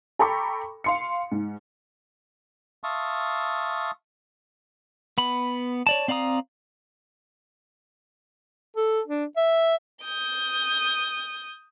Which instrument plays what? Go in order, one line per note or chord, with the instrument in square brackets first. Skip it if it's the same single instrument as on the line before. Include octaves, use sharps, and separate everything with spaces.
[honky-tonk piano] A4 G5 A#5 B5 C#6 D6
F5 C6 C#7
G#2
[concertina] E5 F5 A5 C6 C#6 D#6
[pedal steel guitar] B3 B5
C#5 D5 A5
C4 D5 F5 A#5 D#6
[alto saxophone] A4
D4
E5
[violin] D#6 G6